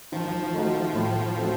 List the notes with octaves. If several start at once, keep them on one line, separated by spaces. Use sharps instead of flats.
D#3 F3
A3 D#4 F#4
A2
A3 C4 F#4